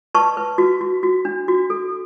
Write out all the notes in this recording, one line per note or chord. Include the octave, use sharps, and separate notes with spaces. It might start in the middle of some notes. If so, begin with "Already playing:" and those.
B4 A5 C#6
B4
F#4
F#4
F#4
D4
F#4
A4